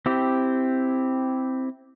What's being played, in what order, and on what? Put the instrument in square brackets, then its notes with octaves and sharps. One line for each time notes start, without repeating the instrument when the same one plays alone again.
[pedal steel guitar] C4 E4 G4